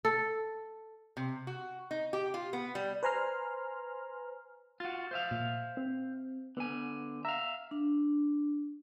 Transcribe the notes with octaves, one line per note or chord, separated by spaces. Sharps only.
A4
C3
F#4
D#4
G4
F4
B3
G3
B4 C5 G#5 A#5 C6 F6
F4 F#4 A6
C5 E5 F5
A#2
C4
D3 B3 G#5
E5 F5 A#5
D4